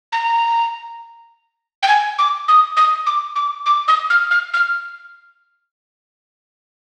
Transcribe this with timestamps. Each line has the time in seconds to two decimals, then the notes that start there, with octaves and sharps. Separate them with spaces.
0.12 A#5
1.83 G5
1.88 G#5
2.19 D6
2.48 D#6
2.77 D#6
3.06 D6
3.36 D6
3.66 D6
3.88 D#6
4.10 F6
4.31 F6
4.54 F6